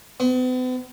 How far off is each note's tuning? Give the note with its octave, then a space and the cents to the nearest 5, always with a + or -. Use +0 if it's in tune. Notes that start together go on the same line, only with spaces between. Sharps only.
B3 +45